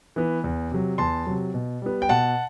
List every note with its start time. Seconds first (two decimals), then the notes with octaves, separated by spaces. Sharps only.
0.16 E3 B3
0.44 E2
0.71 C3 F#3
0.98 E2 A5 C6
1.27 C3 F#3
1.54 B2
1.82 G3 B3
2.02 G5
2.09 B2 F#5 A5